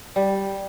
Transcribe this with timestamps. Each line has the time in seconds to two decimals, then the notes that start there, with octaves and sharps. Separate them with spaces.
0.16 G3